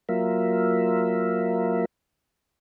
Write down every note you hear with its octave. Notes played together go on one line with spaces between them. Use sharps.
F#3 A#3 F4 A#4 E5